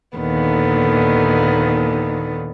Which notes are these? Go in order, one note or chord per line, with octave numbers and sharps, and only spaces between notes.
D#2 A#2 D3 D#3 B3